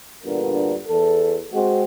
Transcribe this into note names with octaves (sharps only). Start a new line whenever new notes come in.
E2 G2 A#2 D3 B3 A#4
E2 A4
G#3 C4 F#4